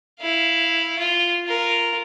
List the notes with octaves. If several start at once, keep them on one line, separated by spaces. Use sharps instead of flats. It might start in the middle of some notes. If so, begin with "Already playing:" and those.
E4 F5
F4
F4 A#4